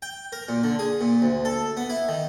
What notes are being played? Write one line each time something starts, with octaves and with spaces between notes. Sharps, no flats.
G5
A#4
A#2
D3
G#4
A#2
D2
A4
B3
E4
D#3